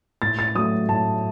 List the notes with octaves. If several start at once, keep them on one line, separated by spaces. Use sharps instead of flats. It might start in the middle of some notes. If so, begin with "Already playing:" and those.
A2 A6
A6
F#3 A3 D#6
A2 A5